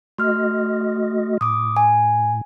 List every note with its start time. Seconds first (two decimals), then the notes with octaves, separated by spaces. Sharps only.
0.18 A3 F#4 D#5 C6 F6
1.41 A2 D6 D#6
1.77 G#5